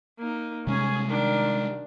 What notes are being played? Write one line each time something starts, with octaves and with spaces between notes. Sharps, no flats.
A#3 D#4
C3 G3 G#3 C#4 G#4
D#3 D4